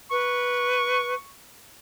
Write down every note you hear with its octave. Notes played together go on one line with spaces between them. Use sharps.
B4 C#6